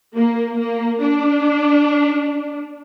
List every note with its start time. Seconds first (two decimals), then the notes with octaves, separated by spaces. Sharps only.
0.15 A#3
0.58 A#3
1.01 D4